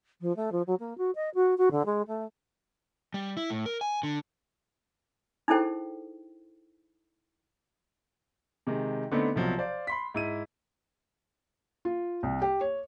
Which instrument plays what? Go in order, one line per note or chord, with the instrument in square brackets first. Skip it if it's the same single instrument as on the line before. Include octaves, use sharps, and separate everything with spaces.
[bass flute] F3
A3
F3
F#3
A#3
F#4
D#5
F#4
F#4
D3
G#3
A3
[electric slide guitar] G3
E4
A2
A#4
G#5
D3
[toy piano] D#4 E4 G#4 A4 C5 G5
[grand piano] C3 D#3 G#3
D3 A3 B3 C4 D#4
C2 B2 F3 F#3
C5 D5 F5
B5 C6 B6
G#2 E4 D#7
[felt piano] F4
C2
G4
C#5